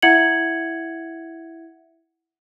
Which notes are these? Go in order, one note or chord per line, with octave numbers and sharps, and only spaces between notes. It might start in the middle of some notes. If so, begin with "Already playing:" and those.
E4 E5 F#5 G#6 C#7 F#7